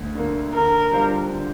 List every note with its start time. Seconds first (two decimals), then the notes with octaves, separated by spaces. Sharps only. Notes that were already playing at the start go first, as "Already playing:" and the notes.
Already playing: D2 D3
0.15 D3 A#3
0.53 D3 A#4
0.91 G3 D4 F4 C5
1.29 D3